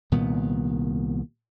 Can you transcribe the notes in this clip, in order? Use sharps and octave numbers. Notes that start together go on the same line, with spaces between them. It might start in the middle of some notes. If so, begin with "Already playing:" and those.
C2 A#2 D#3 B3